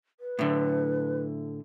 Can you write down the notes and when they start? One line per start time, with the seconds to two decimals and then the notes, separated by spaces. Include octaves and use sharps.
0.20 B4
0.39 A2 D3